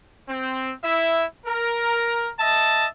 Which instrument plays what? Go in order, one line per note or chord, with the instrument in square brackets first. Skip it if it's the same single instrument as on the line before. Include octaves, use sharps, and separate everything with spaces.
[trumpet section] C4
E4 E5
A#4
D#5 E5 A5